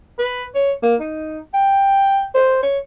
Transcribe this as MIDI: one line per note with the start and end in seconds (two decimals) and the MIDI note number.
0.19 0.46 71
0.55 0.72 73
0.83 0.95 58
1.00 1.39 63
1.54 2.25 79
2.35 2.60 72
2.63 2.79 73